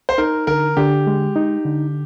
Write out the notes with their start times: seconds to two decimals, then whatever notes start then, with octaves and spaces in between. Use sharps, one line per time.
0.09 C5
0.18 D#4 A#4
0.47 D3 A#4
0.77 D3 G4
1.07 G#3
1.36 D#4
1.65 D3